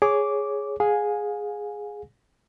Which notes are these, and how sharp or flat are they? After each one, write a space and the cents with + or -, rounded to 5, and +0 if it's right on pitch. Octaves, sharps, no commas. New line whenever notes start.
G#4 +0 C#5 +0 D6 -10
G#4 +0 F5 +35 G#5 -5